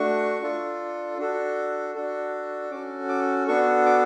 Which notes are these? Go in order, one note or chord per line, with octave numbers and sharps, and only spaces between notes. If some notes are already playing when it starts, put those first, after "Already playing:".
Already playing: A3 D4 F#4 C#6
D4 F4 A4
D4 F#4 A4
D4 F#4 A4
C#4 F#4 A4 D6
D6
B3 D4 F#4 A4 C#6
D6